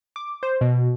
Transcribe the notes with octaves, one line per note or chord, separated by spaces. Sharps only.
D6
C5
B2